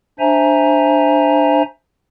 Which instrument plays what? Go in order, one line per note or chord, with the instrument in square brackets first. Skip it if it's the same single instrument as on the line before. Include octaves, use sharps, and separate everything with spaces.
[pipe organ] D4 C5 E5 G#5 A#5